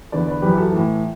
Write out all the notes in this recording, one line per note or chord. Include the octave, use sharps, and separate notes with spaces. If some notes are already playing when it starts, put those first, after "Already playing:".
E2 D3 B4 D5
B4 D5
F#2 E3 G4 B4
F#4 A4
A2 E3